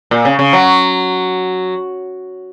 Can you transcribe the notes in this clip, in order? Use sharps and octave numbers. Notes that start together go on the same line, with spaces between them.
A#2
C#3
C#3
F#3